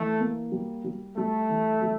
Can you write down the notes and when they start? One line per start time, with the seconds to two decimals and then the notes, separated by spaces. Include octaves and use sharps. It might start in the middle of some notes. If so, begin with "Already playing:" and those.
Already playing: E3 A3
0.20 A#3
0.52 G3
0.85 G3
1.17 G3 A3
1.49 E3
1.82 G3